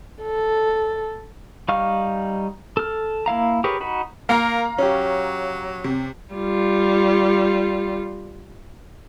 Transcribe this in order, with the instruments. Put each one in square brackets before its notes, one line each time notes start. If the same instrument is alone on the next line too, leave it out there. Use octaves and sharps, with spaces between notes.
[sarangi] A4
[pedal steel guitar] G3 D#4 F5 C#6 F6
A4 F6
A#3 E4 F5 A#5
G4 G#4 A#4 B4 C#5
D#4 F#4 B5
[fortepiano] A#3 [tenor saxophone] A#4 [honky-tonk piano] F5 A#5
[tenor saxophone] F#3 [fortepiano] C#4 G4
[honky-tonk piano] C3
[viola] G3 F4